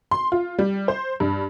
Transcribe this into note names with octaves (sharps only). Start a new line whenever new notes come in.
C6
F4
G3
C5
G2